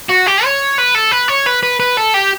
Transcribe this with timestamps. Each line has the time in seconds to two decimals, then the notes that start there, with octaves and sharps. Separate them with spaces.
0.10 F#4
0.27 G4
0.44 C#5
0.78 B4
0.95 A4
1.12 B4
1.29 C#5
1.47 B4
1.63 B4
1.80 B4
1.97 A4
2.14 G4